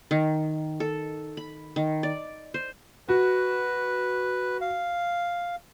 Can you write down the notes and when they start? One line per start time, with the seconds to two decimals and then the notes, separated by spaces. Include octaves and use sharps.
0.11 D#3
0.80 A4
1.37 B5
1.76 D#3
2.03 D5
2.54 C5
3.09 F#4 B4
4.61 F5